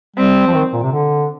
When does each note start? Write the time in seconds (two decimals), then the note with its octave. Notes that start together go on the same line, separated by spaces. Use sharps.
0.16 G3 C4
0.47 F3
0.54 D#3
0.73 A#2
0.83 C3
0.93 D3